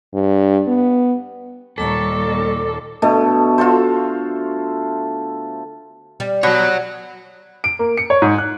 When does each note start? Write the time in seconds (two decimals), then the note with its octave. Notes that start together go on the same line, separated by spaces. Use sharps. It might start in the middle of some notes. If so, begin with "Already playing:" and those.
0.14 G2
0.67 B3
1.78 D#2 A#2 G3 A4 A#5 C#6 D6
3.02 B2 D3 A3
3.58 F4 F#4 A4 C5
6.20 G3
6.43 B2 F#4 C#5 F#6
7.64 D7
7.79 A#3
7.97 C#7
8.10 C#5
8.22 G#2
8.38 F#6